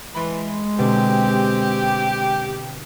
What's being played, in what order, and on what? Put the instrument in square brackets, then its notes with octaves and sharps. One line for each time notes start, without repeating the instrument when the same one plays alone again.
[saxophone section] E3 [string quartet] G#3 [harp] B5 C6
[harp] B2 D3 [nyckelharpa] C4 [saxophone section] G4